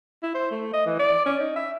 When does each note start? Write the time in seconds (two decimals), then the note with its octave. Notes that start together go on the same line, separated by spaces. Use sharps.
0.23 E4
0.35 C5
0.51 A3
0.73 D#5
0.86 E3
0.99 D5
1.26 C#4
1.39 D#4
1.56 E5